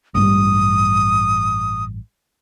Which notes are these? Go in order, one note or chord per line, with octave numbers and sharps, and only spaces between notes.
A1 G2 G3 D#6